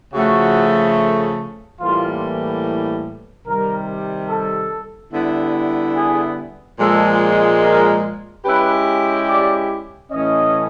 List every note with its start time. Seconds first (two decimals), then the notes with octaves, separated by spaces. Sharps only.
0.14 C#3 F3 A3 F#4
1.80 A2 E3 G3 A#3 F4
3.47 C3 D#3 G3 A#4
4.30 A4
5.13 D3 G3 B3 E4
5.96 G#4
6.80 A#2 F3 G#3 A4
7.62 A#4
8.45 G#3 C#4 E4 G4 B4
9.29 D5
10.11 A2 E3 A3 C#4 D#5